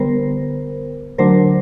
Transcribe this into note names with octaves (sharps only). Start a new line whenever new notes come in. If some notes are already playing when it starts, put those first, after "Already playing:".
Already playing: D3 G3 B3 A#4 C5
D3 F#3 A3 D4 A#4 C5